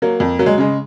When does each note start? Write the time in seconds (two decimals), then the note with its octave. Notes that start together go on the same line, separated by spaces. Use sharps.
0.02 F#3 A#3
0.20 F2
0.39 F#3 A#3
0.46 G#3
0.58 C#3 G#3